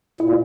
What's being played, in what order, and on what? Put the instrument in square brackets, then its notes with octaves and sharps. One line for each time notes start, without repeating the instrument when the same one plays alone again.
[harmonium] A#2 [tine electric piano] E4